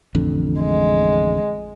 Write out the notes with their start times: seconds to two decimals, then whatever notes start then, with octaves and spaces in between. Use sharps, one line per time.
0.15 A1 F2 D3
0.61 G#3